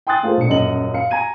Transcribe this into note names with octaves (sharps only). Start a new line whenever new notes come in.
G5 G#5 C6 D#6 F#6 A6
A3 F4 G#4 A#4 C5
B1 D4 C#7
D#1 F#2 D#5 F#7
F5 C#7
G#5 A#5 G#6 D#7